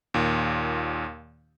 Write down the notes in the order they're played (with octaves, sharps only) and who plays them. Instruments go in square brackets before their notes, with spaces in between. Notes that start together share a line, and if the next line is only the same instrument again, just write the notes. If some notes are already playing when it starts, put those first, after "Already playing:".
[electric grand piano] D#2 A#2